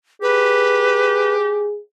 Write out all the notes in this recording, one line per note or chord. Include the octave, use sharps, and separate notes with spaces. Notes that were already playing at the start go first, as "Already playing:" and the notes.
G4 G#4 B4